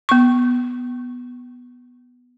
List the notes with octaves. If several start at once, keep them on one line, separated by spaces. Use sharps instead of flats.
B3 C#6